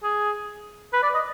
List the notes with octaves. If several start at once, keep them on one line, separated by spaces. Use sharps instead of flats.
G#4
B4
D5
D#5